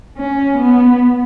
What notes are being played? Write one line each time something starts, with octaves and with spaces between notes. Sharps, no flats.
C#4
B3